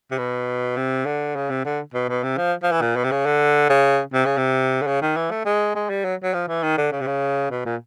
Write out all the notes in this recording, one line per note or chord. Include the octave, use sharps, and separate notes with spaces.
C3
B2
C3
D3
C#3
C3
D3
B2
B2
C3
F3
F3
E3
A#2
B2
C3
C#3
D3
C#3
C3
C#3
C3
D3
C#3
D#3
E3
A3
G#3
G#3
G3
F#3
F#3
F3
E3
D#3
D3
C#3
C3
C#3
B2
A#2